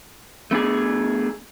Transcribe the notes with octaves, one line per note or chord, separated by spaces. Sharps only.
A3 B3 D4 G#4